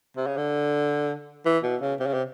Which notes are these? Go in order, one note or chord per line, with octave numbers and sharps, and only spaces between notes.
C3
C#3
D3
E3
B2
C#3
C3
C#3
C3